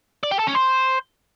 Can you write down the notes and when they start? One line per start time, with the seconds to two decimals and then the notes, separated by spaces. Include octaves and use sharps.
0.23 D5
0.31 G4
0.39 A4
0.47 C#4
0.55 C5